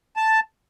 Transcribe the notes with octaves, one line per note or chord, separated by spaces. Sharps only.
A5